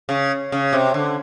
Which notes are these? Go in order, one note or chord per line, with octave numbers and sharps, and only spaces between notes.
C#3
C#3
C3
D3